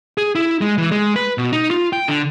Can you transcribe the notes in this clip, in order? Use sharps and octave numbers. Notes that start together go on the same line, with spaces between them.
G#4
E4
G#3
E3
G#3
B4
B2
D#4
F4
G5
D3